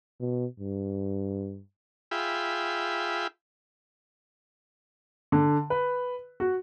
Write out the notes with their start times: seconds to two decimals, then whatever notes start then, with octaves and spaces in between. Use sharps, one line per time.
0.20 B2
0.60 G2
2.11 F4 G#4 E5 G5 B5
5.32 D3
5.70 B4
6.40 F#4